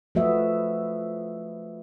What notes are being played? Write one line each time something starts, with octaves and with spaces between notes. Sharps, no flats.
F3 A3 F#4 B4 D#5 E5